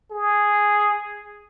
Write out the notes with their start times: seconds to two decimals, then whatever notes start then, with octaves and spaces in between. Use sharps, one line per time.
0.11 G#4